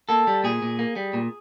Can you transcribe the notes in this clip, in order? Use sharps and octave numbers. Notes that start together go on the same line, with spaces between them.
A#3 A4
G3
A#2 G#4
A#2
A#3
G3
A#2